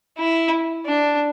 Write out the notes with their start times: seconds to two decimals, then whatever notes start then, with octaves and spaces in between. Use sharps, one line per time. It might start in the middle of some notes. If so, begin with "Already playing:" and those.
0.18 E4
0.86 D4